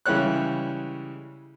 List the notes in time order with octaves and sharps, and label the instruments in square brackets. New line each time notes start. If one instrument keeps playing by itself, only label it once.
[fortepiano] C#3 E3 G3 G#3 C#5 F#6